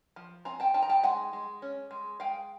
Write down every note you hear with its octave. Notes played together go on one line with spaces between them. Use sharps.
F3
C4 G#5 A#5
G5 A5
D#4 G5 A5
A#5
G5 A5
G#3 F#5 G#5
G#3
C#4
G#3
G#3 F5 G5